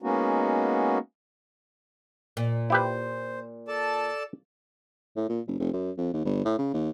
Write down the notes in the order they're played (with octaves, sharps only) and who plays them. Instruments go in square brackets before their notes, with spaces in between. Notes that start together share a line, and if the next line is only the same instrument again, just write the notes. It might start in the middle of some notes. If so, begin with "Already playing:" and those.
[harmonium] G#3 A#3 B3 C#4 D#4 F#4
[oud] A#2
[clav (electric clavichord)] E4 G4 B4 [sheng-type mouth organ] C5
[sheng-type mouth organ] A4 D5 A5
[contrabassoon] A2
A#2
F#1
F1
F#2
F2
D#2
G1
A2
C#3
D#2